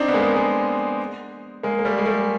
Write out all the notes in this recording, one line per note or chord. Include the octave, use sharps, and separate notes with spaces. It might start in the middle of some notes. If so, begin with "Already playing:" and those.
Already playing: C4 D4 D#4
B3
G#3 A#3
G#3 A#3
G#3 A#3
A#3
G3 A3
G#3
G3 A3